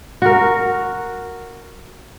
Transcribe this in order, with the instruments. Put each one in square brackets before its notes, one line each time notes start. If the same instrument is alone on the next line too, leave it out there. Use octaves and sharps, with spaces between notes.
[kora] F#4 A#4